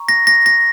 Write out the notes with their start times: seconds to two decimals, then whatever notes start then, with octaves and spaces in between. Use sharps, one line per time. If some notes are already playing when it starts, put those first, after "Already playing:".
Already playing: A#5 C#6
0.09 A#6
0.27 A#6
0.46 A#6